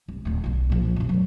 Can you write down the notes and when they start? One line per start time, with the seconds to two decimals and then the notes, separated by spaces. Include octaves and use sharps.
0.08 C2
0.25 D1 D2
0.44 B1 D3
0.70 A#2 F3
0.96 F#2 C3
1.09 F#3 A3